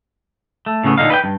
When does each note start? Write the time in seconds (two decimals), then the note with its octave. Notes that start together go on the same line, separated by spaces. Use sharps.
0.66 A3
0.84 A2 C#3 A3 B3
0.98 A#2 D3 D#4 F5
1.10 B4 D#5 G5
1.24 G2